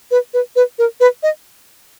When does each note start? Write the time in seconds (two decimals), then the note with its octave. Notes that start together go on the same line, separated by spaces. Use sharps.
0.11 B4
0.34 B4
0.56 B4
0.79 A#4
1.00 B4
1.23 D#5